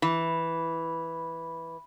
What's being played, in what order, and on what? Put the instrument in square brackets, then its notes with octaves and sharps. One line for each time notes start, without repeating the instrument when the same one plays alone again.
[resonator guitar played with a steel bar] E3 [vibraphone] B5